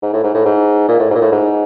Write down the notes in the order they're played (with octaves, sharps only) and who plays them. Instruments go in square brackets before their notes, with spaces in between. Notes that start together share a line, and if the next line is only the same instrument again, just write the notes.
[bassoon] G#2
A2
G#2
A2
G#2
A#2
A2
G#2
A#2
A2
G#2